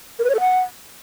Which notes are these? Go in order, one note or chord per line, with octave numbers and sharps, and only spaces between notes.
A#4
B4
C#5
A4
F#5